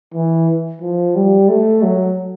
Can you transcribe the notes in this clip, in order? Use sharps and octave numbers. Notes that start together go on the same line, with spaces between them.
E3
F3
G3
A3
F#3